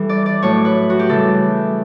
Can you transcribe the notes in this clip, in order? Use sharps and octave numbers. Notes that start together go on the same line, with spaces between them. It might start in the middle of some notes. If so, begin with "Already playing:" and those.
Already playing: E3 G3 A4
D5
D5
A2 F#3 A3 C#5
B4
F#4
G4
C#3 E3 G3 A4